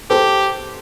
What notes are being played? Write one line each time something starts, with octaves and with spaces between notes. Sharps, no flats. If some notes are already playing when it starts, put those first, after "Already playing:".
G4 A4 C5